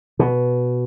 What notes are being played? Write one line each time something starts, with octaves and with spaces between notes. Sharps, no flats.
B2